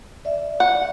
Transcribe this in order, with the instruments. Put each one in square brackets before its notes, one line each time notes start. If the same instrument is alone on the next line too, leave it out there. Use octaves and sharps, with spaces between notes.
[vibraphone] D5 E5
[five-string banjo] F#5